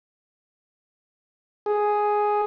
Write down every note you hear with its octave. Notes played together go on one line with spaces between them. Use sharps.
G#4